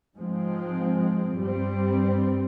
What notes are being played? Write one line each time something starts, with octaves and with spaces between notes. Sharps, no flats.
G#2 F3 G#3 C4
G2 G3 C4